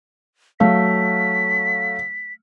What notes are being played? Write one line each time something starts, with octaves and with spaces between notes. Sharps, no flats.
F#3 A3 F5 B6